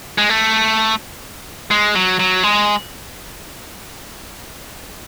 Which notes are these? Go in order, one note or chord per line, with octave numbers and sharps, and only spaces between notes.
G#3
A3
G#3
F#3
F#3
G#3